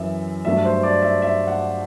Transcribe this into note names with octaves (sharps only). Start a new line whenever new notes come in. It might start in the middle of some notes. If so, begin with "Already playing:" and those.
Already playing: F#2 E3 E5
G2 F#3 A3 E5
C5
D5
E5
E5
F#5